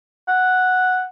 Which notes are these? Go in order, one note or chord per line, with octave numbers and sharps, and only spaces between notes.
F#5